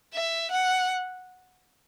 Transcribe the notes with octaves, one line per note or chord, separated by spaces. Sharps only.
E5
F#5